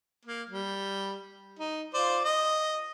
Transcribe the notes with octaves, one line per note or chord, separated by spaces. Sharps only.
A#3
G3
D#4
F4 C5 D5
D#5